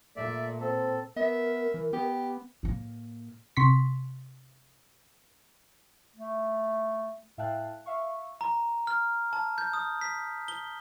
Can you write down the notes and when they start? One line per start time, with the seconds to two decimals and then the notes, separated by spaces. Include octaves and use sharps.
0.16 A#2 A3 D5 E5
0.60 C4 A4
1.16 B3 A#4 E5
1.74 E3
1.93 B3 G4
2.63 A2 A#3
3.57 C3 C6 C#6 B6
6.16 A3
7.38 A2 E5 F5 G5 A5 F#6
7.86 E5 F5 C#6
8.41 A#5
8.87 F6
9.33 A5
9.58 G6
9.73 D#6
10.01 B6
10.48 G7